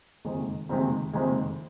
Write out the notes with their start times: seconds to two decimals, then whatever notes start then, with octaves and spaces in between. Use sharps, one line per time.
0.25 F#1 F2 C3 D#3 G#3
0.69 F#1 F2 C3 D#3 G#3
1.13 F#1 F2 C3 D#3 G#3